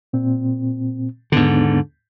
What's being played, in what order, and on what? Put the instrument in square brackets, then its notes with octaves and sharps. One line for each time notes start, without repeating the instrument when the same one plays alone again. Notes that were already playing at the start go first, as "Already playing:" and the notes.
[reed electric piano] A#2 C4
[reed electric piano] D#2 B3 D4 [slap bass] G#2 D3